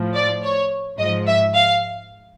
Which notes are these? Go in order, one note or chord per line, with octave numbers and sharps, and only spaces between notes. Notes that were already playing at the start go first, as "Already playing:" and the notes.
Already playing: A2 F3
D5
C#5
G#2 F3 D#5
E5
F5